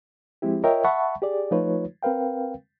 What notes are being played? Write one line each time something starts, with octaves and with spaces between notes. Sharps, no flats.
F3 G#3 C4 E4 G4
F4 A#4 C#5 D#5 E5 G5
E5 F#5 A5 B5 C#6
G4 G#4 D5
F3 A3 D#4 F4 B4 C#5
C4 A#4 B4 F5 G5